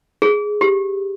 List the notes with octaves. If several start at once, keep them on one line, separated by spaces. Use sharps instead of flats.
G#4
G4